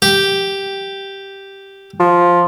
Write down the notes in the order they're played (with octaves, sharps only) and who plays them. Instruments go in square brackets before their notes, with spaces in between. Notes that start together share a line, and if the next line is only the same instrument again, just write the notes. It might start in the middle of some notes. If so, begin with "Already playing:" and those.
[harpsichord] G4
[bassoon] F3